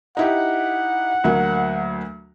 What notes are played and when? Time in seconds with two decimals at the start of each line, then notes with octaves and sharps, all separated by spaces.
0.17 D#4 E4 G4 F#5
1.24 D2 F#3 A#3